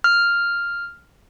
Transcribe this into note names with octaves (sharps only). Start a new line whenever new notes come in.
F6